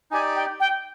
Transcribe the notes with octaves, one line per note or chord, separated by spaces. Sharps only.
D#4 G4 D5 G#5
G5
G5